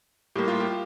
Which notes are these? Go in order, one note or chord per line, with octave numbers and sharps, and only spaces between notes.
A2 G3 A#3 G4
F4
G4